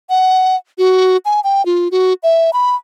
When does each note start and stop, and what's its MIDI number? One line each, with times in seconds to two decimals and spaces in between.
0.10 0.56 78
0.78 1.17 66
1.25 1.40 80
1.44 1.65 79
1.66 1.88 65
1.91 2.14 66
2.23 2.51 76
2.53 2.75 83